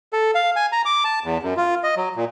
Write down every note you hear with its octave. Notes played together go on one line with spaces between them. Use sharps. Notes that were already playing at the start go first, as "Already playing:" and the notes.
A4
F5
G#5
A#5
D6
A5
E2
F#2
F4
D#5
F#3
A#2